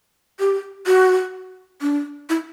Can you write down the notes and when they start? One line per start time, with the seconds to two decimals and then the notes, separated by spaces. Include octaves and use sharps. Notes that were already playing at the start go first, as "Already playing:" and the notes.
0.40 G4
0.87 F#4
1.82 D4
2.30 E4